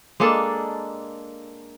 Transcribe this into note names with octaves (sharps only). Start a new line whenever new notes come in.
G#3 A#3 D4 A4